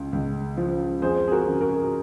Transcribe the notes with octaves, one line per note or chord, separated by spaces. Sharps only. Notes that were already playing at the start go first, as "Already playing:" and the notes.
Already playing: C#2 C#3
C#2
F3
F2 G#4 C5
G#4
F#4 A#4
C#3
F#4 A#4